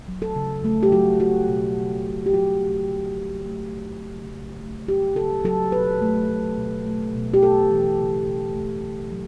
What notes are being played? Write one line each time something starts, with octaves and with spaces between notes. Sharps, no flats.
F#3
A4
C#3
A3
G4
F#3 F#4
A3 F#4
B2
B2
B2
G4
F#3 F#4
A3
D3
A3
A3
F#3
C#3
C#3
A3
F#3 G4
C#3 A4
F#3 A4
B2 B4
A3
A3
B2
A3
B2
G4
A3 A4
E3
C#3
B2
A3
B2
F#3